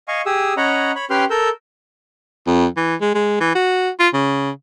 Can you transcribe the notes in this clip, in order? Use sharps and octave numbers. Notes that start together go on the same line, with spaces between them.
D#5 F5 G#5 C#6
G4 G#4 D#6 E6
C#4 C#5 D#5 F#5 A#5 B5
C#5 B5
C#4 G4 B4 G5 C6 F6
A4 A#4 E6 G6
F2
E3
G#3
G#3
E3
F#4
F4
C#3